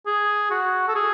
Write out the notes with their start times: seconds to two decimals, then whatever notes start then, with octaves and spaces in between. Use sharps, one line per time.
0.07 G#4
0.51 F#4
0.88 A4
0.95 G#4